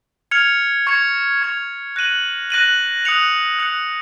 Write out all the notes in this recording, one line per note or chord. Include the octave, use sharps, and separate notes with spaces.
F6 G#6 C#7 F7
C#6 G#6 C#7 F7
C#6 G#6 C#7 F7
F#6 A#6 D#7 F#7
F#6 A#6 D#7 F#7
D#6 F#6 C#7 F7
D#6 F#6 C#7 F7